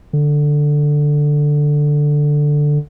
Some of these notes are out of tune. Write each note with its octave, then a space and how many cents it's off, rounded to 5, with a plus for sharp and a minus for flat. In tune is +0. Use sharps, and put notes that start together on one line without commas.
D3 +5